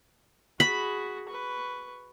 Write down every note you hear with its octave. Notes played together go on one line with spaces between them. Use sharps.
F#4 G#4 B5
B4 C#6